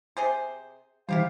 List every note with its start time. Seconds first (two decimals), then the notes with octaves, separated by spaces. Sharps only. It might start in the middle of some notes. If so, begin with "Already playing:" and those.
0.17 C3 G#4 C5
1.09 D#3 E3 G3 E4 G4 C5 F5